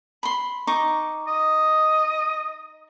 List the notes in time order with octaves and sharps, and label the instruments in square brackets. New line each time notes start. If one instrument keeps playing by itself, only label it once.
[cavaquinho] B5 C6
D#4 C#6 D6
[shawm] D#5